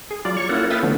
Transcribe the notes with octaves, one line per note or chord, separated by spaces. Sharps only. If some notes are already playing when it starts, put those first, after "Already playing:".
G#4
F#3 F4 D5
C#5 C#6
A#3 C#4 E4 F4 A4 F#5
B4 E5 F5 G5 D#6 A6
D3 F3 A3 B3 C#4